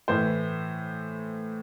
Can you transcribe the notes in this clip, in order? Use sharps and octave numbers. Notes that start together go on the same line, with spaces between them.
A2 E3 C5